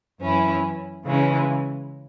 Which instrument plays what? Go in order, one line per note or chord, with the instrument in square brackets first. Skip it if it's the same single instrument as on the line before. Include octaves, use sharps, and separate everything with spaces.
[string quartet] F#2 E3 C#4 E4
C#3 E3 G#3 C#4